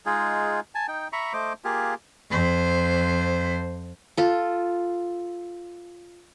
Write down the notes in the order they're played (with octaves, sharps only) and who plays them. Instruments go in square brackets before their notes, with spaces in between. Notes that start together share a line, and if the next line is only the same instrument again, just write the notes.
[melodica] G#3 D#4 F4 G#4
G#5 A5
D#4 G5
E5 A#5 B5 C#6
A3 C5 D#5 D6
A#3 F4 G4 G#4
[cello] F2 C5
[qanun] F4 A4